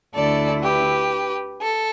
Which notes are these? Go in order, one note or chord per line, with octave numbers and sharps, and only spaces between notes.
D2 D3 A3 E4 A4 D5
G4 B4
A4